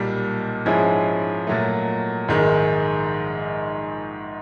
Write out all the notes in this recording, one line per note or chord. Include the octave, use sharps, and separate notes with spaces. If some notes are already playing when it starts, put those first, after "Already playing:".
Already playing: B1 A#2 G3
G#2 F3 G#3 C#4 E4
A#2 F#3 A3
A#1 G#2 D#3 G#3